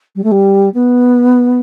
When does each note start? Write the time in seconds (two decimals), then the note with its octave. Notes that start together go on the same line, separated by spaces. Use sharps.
0.15 G3
0.23 A3
0.31 G3
0.73 B3